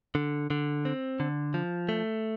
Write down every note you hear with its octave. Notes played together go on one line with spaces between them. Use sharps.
D3
D3
C4
D3
F3
A3